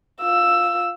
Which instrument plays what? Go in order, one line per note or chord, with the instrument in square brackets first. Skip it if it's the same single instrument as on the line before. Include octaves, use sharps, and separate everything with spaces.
[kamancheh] F4 E6